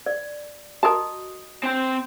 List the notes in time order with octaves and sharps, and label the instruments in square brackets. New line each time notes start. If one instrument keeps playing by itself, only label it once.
[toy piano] D5
[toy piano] F#4 D#5 D#6 [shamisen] A#4 A5
[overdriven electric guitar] C4 G5